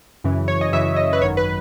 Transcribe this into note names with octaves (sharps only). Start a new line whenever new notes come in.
F#2 C#3 E3
C#5
D#5
F#2 C#3 E3 E5
D#5
B4
G#1 F#2 D#3 F#3 C#5
B4